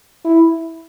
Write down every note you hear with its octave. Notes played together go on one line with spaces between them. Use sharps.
E4